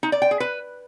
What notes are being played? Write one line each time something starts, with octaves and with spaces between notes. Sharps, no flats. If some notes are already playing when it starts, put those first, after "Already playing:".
D#4
D5
G5
G#4
B4